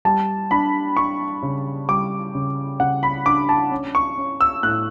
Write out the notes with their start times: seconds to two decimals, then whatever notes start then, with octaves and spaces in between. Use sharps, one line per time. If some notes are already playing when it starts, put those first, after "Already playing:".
0.05 G3 A5
0.51 D4 B5
0.97 D4 C#6
1.43 C#3
1.88 G3 D6
2.35 C#3
2.80 C#3 F#5
3.03 B5
3.26 D4 D6
3.49 A5
3.71 C#4
3.95 C#6
4.18 C#4
4.41 E6
4.63 A2 F#6